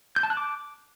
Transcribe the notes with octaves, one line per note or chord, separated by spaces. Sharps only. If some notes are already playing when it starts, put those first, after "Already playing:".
G6
A5
F#6
D6